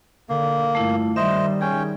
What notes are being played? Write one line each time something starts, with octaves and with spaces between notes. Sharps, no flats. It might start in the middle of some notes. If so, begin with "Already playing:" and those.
D3 A#3
G2 A3 E4 F4
D#3 G3 C5 D#5 E5
C#4 D#4 G#4 G5